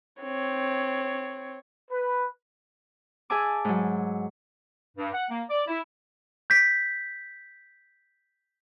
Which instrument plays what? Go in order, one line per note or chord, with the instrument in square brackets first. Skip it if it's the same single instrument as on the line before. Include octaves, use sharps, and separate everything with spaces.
[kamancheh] C4 C#5
[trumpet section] B4
[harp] G#4 E5 G#5 A5 D6
G#2 F#3
[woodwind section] G2
F#5
A#3
D5
E4
[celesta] G6 B6